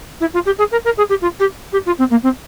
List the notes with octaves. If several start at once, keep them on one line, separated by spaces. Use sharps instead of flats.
E4
F4
G4
G#4
A#4
A#4
G#4
G4
F4
G4
G4
F4
C4
A#3
C4